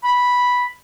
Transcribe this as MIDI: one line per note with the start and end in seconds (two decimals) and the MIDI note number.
0.04 0.67 83